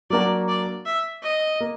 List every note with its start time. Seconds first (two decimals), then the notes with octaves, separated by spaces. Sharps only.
0.10 F#3 A#3 D4 F#4 D5
0.48 D5
0.86 E5
1.23 D#5
1.60 A#3